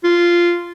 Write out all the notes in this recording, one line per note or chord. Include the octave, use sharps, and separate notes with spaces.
F4